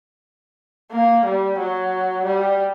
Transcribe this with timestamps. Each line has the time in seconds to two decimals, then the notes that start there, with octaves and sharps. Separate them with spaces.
0.92 A#3
1.25 G3
1.59 F#3
2.26 G3